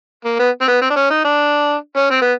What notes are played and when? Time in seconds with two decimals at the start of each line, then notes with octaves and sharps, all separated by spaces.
0.25 A#3
0.39 B3
0.62 C4
0.68 B3
0.82 C4
0.90 D4
0.96 C#4
1.10 D#4
1.25 D4
1.97 C#4
2.11 C4
2.22 B3